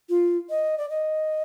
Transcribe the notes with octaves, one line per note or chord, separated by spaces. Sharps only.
F4
D#5
D5
D#5